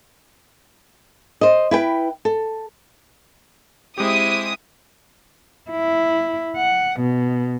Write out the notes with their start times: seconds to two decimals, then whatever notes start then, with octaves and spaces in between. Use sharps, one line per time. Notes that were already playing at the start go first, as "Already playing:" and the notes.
1.41 C5 D#5
1.71 E4 B4 G5
2.25 A4
3.98 G#3 C4 E4 G4 D#6
5.71 E4
6.57 F#5
7.00 B2